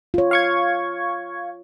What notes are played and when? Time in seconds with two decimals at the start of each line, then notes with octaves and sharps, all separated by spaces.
0.14 F4 C#5
0.31 F5 C#6 G#6